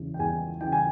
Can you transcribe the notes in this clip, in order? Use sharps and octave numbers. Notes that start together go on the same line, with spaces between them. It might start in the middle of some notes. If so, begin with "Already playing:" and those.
Already playing: E2 C#3 E3
G5
E2 G#5
C#3 E3 G5
G#5